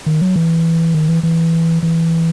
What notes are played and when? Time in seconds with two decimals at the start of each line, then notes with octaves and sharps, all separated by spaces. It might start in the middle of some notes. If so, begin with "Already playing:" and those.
0.06 D#3
0.21 F#3
0.36 E3
0.95 D#3
1.09 E3
1.23 E3
1.83 E3